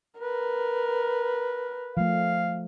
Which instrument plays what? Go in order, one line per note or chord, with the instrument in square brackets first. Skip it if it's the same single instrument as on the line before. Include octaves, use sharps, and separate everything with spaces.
[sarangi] A#4 [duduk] B4
[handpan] F3 A3 [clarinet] F5